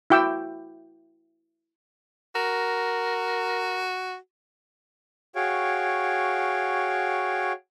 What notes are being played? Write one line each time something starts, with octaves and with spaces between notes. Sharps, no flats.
E4 F#4 G5 D6 E6
F#4 A#4
F#4 G#4 C#5 F5 G5